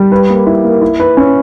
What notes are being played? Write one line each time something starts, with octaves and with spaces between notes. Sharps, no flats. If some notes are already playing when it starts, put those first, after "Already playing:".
Already playing: G3
B4
A#3
E4
A#3
E4
B4
C#4